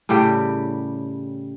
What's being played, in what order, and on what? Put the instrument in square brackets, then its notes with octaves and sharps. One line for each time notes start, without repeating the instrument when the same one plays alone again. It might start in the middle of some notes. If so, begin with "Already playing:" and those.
[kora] A2 C#3 G3 G4